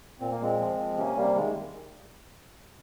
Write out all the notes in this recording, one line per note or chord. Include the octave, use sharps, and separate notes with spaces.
A#2 C4
A#3
A#2 G#3 C4
F3
F3
C3 A#3 C#4
C3 G3 A#3
D#3 G#3